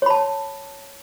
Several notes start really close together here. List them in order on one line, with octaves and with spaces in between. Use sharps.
C#5 B5 A5